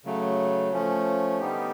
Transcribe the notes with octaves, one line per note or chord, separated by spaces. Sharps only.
C#3 F#3 A3
F3 A3 C#4
D3 G3 B3 D#4 G4